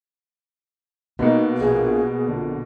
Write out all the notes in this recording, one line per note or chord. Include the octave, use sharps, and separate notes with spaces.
B2 A#3 B3 D#4
A#1 G#4
A#1 F2 D3